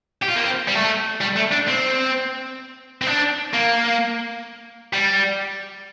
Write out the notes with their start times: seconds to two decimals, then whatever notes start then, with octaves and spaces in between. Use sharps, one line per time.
0.22 G4
0.28 F4
0.36 A#3
0.43 C4
0.68 G3
0.75 A3
1.21 G3
1.36 A3
1.51 D4
1.68 C4
3.02 C4
3.07 D4
3.53 A#3
4.93 G3